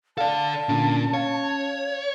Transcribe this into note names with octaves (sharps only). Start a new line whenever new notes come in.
A4 D5 F5 A5
A#2 D3 C#4
C#5 F5